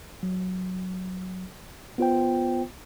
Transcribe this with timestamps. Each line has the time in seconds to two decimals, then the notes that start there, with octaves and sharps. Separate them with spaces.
0.23 F#3
1.98 B3 F4 C5 G5